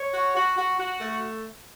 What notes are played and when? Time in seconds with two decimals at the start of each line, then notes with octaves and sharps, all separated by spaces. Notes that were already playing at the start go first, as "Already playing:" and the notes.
Already playing: C#5
0.14 F#4
0.36 F#4
0.57 F#4
0.78 F#4
1.01 A3